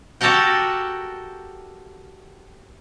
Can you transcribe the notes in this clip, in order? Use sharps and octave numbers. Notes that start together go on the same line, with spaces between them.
F#4 G4 A4 A#4 F#5 G5